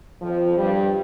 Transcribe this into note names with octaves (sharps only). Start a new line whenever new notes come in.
F2 F3
G2 G3